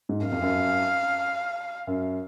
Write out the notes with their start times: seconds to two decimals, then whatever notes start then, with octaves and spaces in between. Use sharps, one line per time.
0.09 G#2
0.21 F#2
0.27 F2 F5
0.42 F#2
1.87 F#2